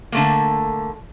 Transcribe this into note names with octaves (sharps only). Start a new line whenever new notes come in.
D3 A3 A#3